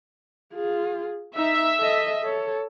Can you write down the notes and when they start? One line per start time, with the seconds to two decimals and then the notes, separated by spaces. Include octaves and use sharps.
0.53 F4 G#4
1.36 D#4 E5
1.80 A4 D#5
2.22 A4 C#5